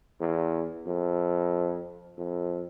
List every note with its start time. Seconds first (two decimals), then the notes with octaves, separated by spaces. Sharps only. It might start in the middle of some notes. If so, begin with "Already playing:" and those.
0.21 E2
0.87 F2
2.18 F2